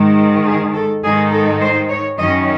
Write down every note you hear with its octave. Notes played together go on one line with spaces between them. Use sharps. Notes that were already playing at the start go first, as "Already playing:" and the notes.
Already playing: G#2 D#3 G#3
G#4
A4
G#2 D#3 G#3 D#4 G#4
A4
C5
C#5
F#2 D#3 F#3 C#4 D#5